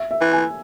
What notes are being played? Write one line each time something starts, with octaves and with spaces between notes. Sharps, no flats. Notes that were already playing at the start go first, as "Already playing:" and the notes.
Already playing: E5
E5
E3
G#5